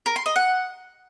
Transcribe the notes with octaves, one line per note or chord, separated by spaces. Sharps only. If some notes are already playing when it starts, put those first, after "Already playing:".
A#4
C6
D#5
F#5